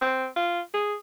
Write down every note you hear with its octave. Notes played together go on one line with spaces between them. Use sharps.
C4
F4
G#4